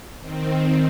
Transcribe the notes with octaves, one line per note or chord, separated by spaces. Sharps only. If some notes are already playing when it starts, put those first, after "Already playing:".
D#3 C4